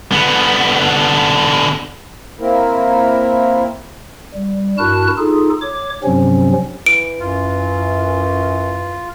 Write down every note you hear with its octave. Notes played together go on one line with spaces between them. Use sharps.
D3 B3
A#3 C4 E4 A#4
G3
G2 E4 F#4 A#4 A5 F#6
D#4 F4 G#4 A4
C#5 D6
G2 C3 F3 F#3 C4 C#4
E3 D7
F#2 F4